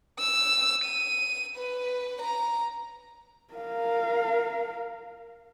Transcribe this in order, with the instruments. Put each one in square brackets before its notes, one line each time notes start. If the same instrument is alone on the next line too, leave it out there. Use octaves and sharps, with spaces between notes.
[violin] E6
D#7
B4
A#5
[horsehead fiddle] A#4 F5